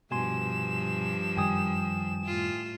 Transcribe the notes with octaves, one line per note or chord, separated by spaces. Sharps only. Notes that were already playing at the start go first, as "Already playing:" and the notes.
G2 B2 F3 G#5 C6 E7
F#2 D#3 G3 G5 G#5 D#6
A2 F4